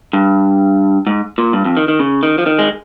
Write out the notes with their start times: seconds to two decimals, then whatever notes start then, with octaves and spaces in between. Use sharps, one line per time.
0.13 G2
1.07 G#2
1.38 A#2
1.53 G2
1.65 F2
1.77 D#3
1.88 D#3
1.99 C#3
2.23 D#3
2.38 F3
2.46 D#3
2.59 G#3